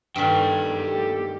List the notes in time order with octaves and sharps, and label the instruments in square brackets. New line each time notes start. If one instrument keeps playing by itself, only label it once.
[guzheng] G2 D#3 [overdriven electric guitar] A4 G5
[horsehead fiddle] G4